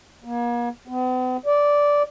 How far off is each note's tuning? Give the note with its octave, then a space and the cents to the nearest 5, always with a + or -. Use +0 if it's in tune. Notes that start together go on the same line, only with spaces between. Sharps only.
A#3 +40
B3 +45
D5 -10